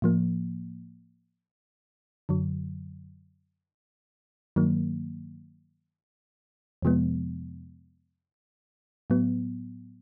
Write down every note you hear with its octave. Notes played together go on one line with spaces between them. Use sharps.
A2 F3 A#3
F#2 D3 F#3
G2 D#3 F#3 A#3
F2 C3 F3 G#3 B3
A2 F#3 B3